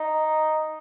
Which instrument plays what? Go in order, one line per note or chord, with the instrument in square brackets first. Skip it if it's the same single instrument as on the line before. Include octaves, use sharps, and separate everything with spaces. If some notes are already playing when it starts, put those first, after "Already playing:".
Already playing: [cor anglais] D#4